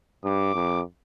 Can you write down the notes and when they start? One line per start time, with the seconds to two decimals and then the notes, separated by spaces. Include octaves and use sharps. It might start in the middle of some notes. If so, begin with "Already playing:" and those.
0.24 G2 D6
0.55 F2